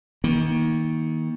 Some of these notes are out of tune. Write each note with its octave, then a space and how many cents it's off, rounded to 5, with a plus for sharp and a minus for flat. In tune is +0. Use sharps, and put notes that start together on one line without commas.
D#3 +25 A#3 +25